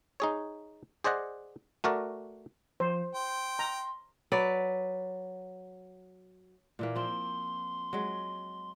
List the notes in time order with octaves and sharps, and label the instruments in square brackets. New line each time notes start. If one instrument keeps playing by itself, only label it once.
[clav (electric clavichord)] D#4 G#4 C#5
G#4 C5 D5 D#5 F#5
A3 F#4 A#4 D5
[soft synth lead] F3 [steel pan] C5
[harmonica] G5 [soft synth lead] C6
[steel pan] A#5
[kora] F#3 B4 D5
A#2 E3 A#3
[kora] F3 C4 [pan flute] C6
[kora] F#3 G#3